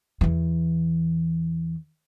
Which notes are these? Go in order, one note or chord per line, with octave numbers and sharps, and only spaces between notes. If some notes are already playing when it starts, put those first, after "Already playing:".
E2 E3